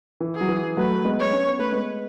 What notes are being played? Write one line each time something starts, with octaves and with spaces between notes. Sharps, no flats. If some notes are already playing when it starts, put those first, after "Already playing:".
E3
G#4
F#3
E3
F#3 A3 B4
G#3 B3
C#5
C#4
B3
A3 B4
G#3 B3